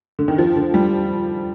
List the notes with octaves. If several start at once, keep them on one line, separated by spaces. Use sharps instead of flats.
D3
D#3
F3
D3
G3